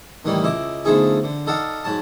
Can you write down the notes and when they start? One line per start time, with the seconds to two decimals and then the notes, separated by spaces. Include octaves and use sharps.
0.25 A2 D#3 E3 G3 A#3 D#4
0.43 C#2 E4 D#5 D6
0.85 D3 F3 A3 B3 D#4 G#4
1.24 D3
1.47 D#4 A4 D5 F5 F#5
1.84 G#2 F#3 A5